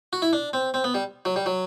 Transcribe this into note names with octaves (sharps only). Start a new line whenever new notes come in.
F#4
E4
D4
C4
C4
B3
G3
F#3
G3
F#3